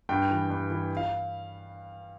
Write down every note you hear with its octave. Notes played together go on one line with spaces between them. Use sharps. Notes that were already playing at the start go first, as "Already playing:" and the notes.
G2 G5
E3
G2
E3
F5